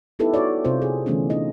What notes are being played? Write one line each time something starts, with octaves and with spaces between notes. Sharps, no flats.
B3 D#4 E4 G4 A4 B4
F#4 C#5 D5
C3 C4 F4 C5
G#4
D3 E3 A3 B3 C#4 D4
E3 D#4 F4 D#5